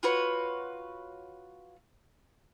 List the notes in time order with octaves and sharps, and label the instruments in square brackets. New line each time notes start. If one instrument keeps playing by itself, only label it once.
[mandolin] F4 F#4 B4 C#5